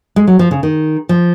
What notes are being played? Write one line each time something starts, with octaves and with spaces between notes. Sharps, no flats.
G#3
F#3
F3
C#3
D#3
F3